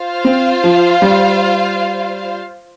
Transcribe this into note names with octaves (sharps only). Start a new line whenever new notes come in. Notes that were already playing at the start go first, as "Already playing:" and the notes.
Already playing: F4 C5 F5
C4
F3
G3